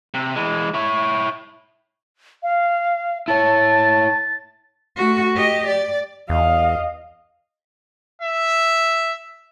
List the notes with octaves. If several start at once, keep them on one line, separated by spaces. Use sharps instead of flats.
C3
E3 G#3
E4 C#5
F5
E4 C#5 A5 A6
A3 F#4
G4 D#5
D5
E2 D#5 F5
E5